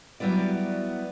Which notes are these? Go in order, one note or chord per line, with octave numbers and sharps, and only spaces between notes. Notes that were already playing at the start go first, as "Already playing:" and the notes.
F#3 G3 B3 E4 D5